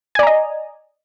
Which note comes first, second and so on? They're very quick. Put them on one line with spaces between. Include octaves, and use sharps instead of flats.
G#5 D5 A#5 D#5